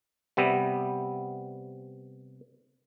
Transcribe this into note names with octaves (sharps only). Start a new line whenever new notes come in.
C3 G3 B3 E5